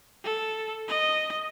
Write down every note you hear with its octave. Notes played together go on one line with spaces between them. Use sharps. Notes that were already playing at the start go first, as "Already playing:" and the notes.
A4
D#5